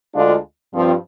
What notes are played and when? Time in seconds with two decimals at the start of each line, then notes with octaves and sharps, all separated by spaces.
0.14 D2 D3 G#3 D4 F4
0.74 G2 F3 C4